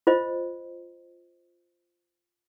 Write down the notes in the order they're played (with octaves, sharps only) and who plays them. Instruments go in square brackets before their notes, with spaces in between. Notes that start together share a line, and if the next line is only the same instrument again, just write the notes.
[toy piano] F4 C5 D#5